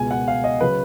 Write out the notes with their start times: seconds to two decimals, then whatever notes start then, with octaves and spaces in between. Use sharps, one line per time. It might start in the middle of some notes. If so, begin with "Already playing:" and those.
Already playing: C#2 B2 G#3 G#5
0.11 F#5
0.28 F5
0.44 D#5
0.61 C#3 F#3 B4